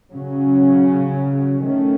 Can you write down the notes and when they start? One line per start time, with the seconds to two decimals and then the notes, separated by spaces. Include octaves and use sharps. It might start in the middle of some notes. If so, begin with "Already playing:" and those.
0.11 C#3 F#3 C#4
1.64 D#3 A3 C#4